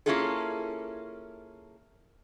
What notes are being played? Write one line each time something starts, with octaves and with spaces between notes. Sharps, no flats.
A#3 C#4 E4 F4 G#4 A4